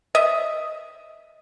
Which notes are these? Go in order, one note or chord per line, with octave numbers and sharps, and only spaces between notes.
D#5 E5